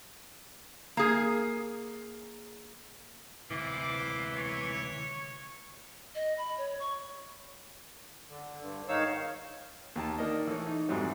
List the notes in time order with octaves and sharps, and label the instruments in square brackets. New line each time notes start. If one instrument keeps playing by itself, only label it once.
[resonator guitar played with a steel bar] A#3 G#4
[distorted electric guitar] D2 C3 [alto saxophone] E3 [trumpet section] C5 F5 D6
[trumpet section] C#5
[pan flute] D#5
B5
C#5
C#6
[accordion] D3
G2 D3
G#2 D#3 D#4 C#5 F5 E6
[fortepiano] D#2 G4 A5
A#3 D4 D#4 D#5
E3 A3 C#5
D#4
F2 G#2 E3 F#3 G3